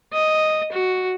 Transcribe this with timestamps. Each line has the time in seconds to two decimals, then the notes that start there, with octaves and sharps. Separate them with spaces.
0.13 D#5
0.72 F#4